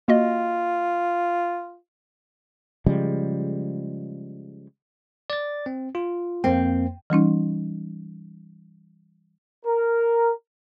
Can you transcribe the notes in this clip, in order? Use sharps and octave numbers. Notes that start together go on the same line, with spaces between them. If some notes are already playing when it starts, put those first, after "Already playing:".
A#3 F4 F#4 D#5
C#3 F3 G3 G#3
D5 A6
C4
F4
F2 A#3 C4 G5
E3 G3 C#4 D#4
A#4